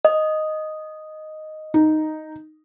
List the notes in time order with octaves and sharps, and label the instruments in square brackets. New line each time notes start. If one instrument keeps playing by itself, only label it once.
[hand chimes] D#5
[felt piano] D#4